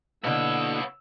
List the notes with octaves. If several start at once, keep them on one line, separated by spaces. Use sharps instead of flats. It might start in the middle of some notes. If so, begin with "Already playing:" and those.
B2 D3 A#3 B3 D4 E4 C#5 E6